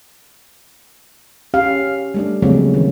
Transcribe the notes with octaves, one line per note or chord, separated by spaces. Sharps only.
C#4 G4 F5
G3 A3 D4
C#3 F3 F#3 G#3 A#3 C4
D#3 E3